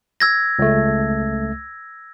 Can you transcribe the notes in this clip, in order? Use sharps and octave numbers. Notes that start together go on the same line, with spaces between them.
E6 G#6 A#6
C#2 A3